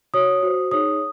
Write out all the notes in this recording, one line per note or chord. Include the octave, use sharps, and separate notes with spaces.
F#4 C#5 D#6
F#4 C5
D#4 G#4 C#5 D#6